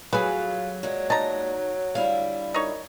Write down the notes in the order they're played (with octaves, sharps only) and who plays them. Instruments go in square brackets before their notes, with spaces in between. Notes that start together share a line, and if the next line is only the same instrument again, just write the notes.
[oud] F#3 G#4 [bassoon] F4 [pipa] B4
[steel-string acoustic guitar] A#2 G#3 [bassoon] F#3
[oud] D#4 [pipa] A5 A#5
[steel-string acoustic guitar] D3 G3 E4 [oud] F5
[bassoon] F#2 [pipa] D#4 C#5